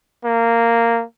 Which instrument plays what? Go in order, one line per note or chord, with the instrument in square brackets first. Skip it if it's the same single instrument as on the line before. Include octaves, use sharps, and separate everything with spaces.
[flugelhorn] A#3